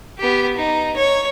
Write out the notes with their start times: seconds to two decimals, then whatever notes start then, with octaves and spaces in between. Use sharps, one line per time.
0.18 B3 G4
0.57 D#4
0.96 C#5